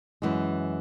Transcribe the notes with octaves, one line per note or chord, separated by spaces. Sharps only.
F#2 E3 G#3